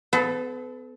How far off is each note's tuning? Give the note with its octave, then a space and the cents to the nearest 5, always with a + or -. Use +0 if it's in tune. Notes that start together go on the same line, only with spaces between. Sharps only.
B3 +35 A4 -25